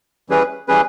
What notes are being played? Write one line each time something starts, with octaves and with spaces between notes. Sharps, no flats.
E3 G3 C#4 G#4 B4
E3 G3 C#4 G#4 B4